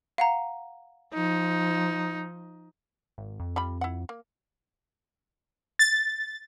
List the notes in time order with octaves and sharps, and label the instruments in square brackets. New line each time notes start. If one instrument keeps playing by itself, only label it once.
[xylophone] F5 F#5 A#5
[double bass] F3 [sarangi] D#4
[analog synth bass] G#1
F2
[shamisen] G3 F4 B5
E4 F#5
A#3
[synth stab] A6